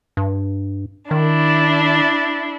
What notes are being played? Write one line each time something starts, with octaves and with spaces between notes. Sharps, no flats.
G2
D#3 D4 E4